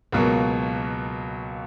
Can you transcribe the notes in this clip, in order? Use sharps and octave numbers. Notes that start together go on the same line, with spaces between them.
C#2 B2 F#3 A#3